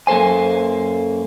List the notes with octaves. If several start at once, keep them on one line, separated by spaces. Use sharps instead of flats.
F#2 A#3 A4 C5 G#5